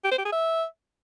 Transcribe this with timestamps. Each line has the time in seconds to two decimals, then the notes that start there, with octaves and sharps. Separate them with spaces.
0.04 G4
0.11 C5
0.18 G4
0.25 G#4
0.32 E5